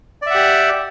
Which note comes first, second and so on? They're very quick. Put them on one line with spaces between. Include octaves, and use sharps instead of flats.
D5 E5 F#5 G4